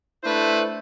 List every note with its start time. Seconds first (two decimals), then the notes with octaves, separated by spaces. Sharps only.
0.24 A3 D4 E4 B4 C5